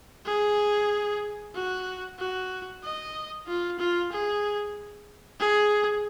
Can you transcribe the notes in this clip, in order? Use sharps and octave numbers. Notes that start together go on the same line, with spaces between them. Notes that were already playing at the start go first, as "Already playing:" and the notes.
G#4
F#4
F#4
D#5
F4
F4
G#4
G#4